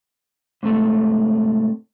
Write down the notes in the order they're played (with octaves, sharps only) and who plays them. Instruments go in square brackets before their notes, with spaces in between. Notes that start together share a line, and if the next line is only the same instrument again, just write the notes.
[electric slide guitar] G#2 C3 A3